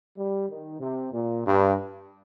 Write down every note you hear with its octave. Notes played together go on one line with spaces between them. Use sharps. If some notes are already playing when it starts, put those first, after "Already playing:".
G3
D#3
C3
A#2
G2